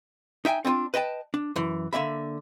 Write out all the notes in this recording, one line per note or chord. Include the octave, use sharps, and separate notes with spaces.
D#4 E5 G5 G#5
C4 D4 D#4 F4
B4 D#5 G5 A5
D4
F#2 E3
D3 A#3 E5 B5